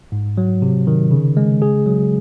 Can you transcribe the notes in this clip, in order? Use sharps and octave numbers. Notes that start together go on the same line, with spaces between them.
G#2
F#3
C3
D#3
C#3
G#3
G#4
F#3